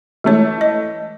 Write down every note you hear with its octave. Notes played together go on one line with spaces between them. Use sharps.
E3 G#3 A3 C#5
D#5